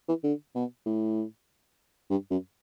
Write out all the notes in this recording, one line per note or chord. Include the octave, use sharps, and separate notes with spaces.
E3
D3
B2
A2
G2
F#2